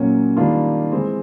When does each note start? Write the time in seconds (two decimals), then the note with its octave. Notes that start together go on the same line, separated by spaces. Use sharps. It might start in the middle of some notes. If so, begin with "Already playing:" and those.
Already playing: A#2 F#3 A#3 C#4
0.36 D#3 G3 A#3 D4 F4
0.91 E3 G#3 C4